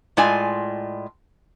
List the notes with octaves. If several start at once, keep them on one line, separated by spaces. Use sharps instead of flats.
A2 G#3 F4 D5 G#5